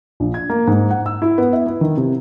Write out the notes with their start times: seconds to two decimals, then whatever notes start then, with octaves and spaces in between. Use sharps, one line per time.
0.20 A#1
0.34 G#6
0.50 A#3
0.67 G#2
0.90 F#5
1.06 E6
1.22 E4
1.38 B3
1.53 E5
1.66 E4
1.81 D#3
1.97 C3